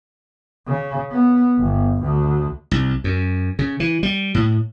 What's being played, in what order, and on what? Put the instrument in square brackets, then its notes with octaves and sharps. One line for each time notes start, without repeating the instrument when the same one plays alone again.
[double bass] C#3
B3
G1
D2
[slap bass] C2
F#2
C#3
E3
G3
A2